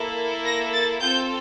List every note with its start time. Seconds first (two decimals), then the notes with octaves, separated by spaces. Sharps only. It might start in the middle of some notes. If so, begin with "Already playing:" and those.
Already playing: A#3 E4 A4
0.45 A#6
0.73 A6
1.01 C4 F4 A4 G6